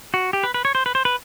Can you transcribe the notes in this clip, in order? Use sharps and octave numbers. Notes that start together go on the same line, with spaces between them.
F#4
G4
B4
B4
C#5
C5
B4
C5
B4